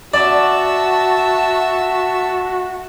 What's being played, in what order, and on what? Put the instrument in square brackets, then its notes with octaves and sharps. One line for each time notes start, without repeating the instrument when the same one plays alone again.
[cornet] F#4 [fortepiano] D5 [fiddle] E5 A5